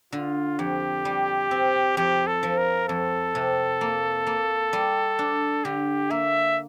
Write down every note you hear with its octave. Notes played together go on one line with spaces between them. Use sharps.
D3 F4
F2 G4
G3
C4
F2 G4
A4
F3
A#4
F2 A4
C3
A#3
A#3
G3
D4
D3 G4
A#3 E5